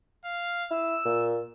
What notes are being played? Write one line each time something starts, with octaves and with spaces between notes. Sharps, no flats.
F5
E4 E6
A#2